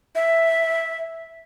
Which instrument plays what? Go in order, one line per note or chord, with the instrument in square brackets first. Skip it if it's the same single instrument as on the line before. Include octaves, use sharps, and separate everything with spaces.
[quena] E5